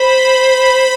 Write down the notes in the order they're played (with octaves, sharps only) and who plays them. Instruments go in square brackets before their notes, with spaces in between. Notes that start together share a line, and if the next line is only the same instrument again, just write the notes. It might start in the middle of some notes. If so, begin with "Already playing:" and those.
Already playing: [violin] C5 [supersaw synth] B5